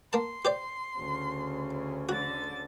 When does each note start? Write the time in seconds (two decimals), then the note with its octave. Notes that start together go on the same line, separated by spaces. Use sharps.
0.13 A#3 A5 C6
0.45 G4 C5 D5
0.99 D2 C#3
2.09 D3 F#4 A6